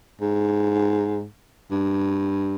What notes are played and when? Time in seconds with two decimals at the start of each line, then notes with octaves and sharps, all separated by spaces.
0.21 G#2
1.71 G2